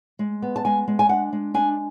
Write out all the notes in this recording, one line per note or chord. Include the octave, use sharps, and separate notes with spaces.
G#3
B3
A5
G#3 G#5
G#3
G#5
D4 F#5
G#3
D4 G#5